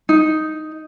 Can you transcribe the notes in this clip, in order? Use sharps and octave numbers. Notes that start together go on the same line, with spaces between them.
D#4